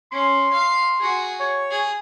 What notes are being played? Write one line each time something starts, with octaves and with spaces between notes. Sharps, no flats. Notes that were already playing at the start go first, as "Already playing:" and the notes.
C#4 C6
F5
F#4 G#4
C#5
G#4